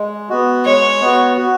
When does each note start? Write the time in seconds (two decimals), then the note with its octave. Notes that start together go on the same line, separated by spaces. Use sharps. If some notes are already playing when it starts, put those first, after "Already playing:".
Already playing: G#3
0.29 B3 F#4
0.65 G#3 C#5
1.01 B3 F#4
1.37 F#4